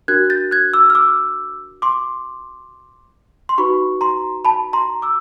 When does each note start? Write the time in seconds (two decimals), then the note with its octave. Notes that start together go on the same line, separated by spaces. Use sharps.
0.08 D4 F#4 A#4 F#6 G#6
0.30 G6 A6
0.51 F#6 G#6
0.74 D6 E6
0.90 F6
0.95 D6 E6
1.82 C6 D6
3.49 C6
3.58 D#4 F#4 B4 B5 C#6
4.01 A#5 C6
4.45 A5 B5
4.73 A#5 C6
5.02 D6 E6